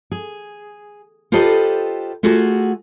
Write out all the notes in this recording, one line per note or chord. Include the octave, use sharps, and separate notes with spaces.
G#4
F4 G4 A4 B4 C5 D#5
A3 F4 F#4 G#4